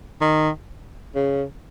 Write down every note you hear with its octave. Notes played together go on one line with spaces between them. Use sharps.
D#3
C#3